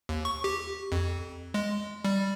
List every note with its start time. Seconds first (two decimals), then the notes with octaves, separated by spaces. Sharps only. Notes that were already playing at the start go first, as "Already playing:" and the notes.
0.09 D#2
0.25 C#6
0.44 G4
0.92 F2
1.54 G#3
2.04 G3